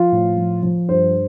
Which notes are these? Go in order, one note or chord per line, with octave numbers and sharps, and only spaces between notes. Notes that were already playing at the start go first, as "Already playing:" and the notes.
Already playing: F3 F4
A2
F3
F3
G2 C5